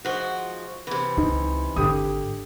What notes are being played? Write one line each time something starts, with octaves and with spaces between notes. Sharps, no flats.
G#2 F3 F#4
C3 E3
C#2 D#4
G#1 D3 G4 D#6